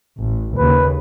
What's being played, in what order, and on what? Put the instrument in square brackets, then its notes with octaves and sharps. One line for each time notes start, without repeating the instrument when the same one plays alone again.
[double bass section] A1
[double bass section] D#2 C#3 [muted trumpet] B4